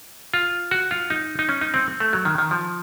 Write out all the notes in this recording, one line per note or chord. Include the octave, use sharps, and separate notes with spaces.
F4
F#4
F4
D#4
D#4
C#4
D#4
C4
A3
F#3
D#3
D#3
F3